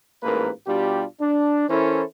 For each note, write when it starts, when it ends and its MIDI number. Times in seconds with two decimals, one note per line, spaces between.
0.23 0.50 33
0.23 0.50 44
0.23 0.50 58
0.23 0.50 70
0.23 0.50 71
0.67 1.04 47
0.67 1.04 55
0.67 1.04 62
0.67 1.04 65
0.67 1.04 67
1.20 1.67 62
1.69 2.03 52
1.69 2.03 61
1.69 2.03 64
1.69 2.03 69
1.69 2.03 70
1.69 2.03 72